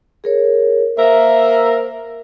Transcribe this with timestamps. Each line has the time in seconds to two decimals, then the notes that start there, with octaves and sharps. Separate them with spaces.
0.24 G#4 A#4 C#5
0.97 A#3 A#4 C5 E5